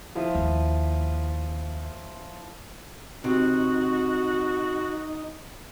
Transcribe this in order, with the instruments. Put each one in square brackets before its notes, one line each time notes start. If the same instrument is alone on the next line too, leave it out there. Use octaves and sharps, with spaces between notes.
[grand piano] F3 E4 F4
[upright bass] D#2
[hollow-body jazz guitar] C3 [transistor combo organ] D#4 [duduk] F#4